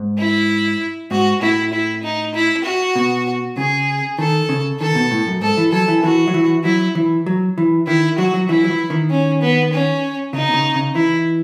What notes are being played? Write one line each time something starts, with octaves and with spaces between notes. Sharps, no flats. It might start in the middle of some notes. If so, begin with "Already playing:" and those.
Already playing: G#2
E4
G#2 F#4
A2 E4
E4
D#4
E4
F#4
B2
C#3 G#4
D#3 A4
C#3
D#3 A4
B2
A2
F#2
G#2 A4
E3
F#3 A4
E3
E3 F#4
F#3
E3
F#3 E4
E3
F#3
E3
D#3 E4
F#3 F#4
F#3
E3 E4
F#3
E3
D#3
C#4
B3
C#4
C#3 D#4
B2
C#3
C#3
E3 E4